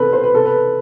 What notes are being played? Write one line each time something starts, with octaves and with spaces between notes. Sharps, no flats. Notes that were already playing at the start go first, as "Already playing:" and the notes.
Already playing: C3 C4 A4 B4
C5
B4
C3 A4
B4